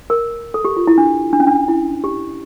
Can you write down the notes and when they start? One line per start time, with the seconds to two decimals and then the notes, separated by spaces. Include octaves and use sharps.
0.10 A#4
0.54 A4
0.65 G4
0.76 F4
0.87 E4
0.98 D4
1.33 D4
1.40 C#4
1.47 D4
1.68 E4
2.04 G4